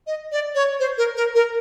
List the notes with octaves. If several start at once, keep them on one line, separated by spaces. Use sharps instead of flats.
D#5
D5
C#5
C5
A#4
A#4
A#4